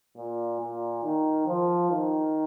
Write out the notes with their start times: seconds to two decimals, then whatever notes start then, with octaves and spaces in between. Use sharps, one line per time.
0.16 A#2
0.60 A#2
1.04 D#3
1.47 F3
1.90 D#3